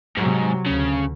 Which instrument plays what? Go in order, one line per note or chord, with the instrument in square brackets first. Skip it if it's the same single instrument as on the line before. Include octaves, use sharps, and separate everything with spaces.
[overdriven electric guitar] G#2 [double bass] C3 F#3
[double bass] D2 [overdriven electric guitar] C#3